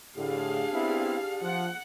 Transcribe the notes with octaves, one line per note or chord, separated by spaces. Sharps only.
A2 D3 D4 G4 G#4 F5
B3 C4 E4
F3 F#5